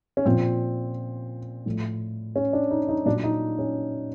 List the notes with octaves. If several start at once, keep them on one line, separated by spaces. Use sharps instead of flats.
C#4
A#2 F3 C4
A2 F3
C#4
D4
D#4
D#4
A#2 F#3 D4
D#4
C#4